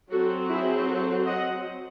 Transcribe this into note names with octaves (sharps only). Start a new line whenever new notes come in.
F#3 C4 F#4 A4
E4 G#4
F#4 A4
D#5 F#5